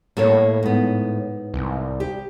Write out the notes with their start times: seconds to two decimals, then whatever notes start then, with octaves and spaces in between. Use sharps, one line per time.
0.17 A2 A#3 A4 C#5
0.63 G#2 B3
1.54 C2
2.00 G4